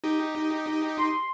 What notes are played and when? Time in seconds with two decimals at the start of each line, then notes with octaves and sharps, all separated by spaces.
0.04 D#4 G4
0.97 C6